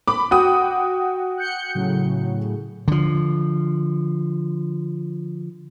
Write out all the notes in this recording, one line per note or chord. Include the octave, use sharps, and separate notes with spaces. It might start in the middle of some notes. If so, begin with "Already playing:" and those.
B5 D6
F#4 G5 D#6
F#6 G6 C#7
A2 C#3 F#3
D3 F3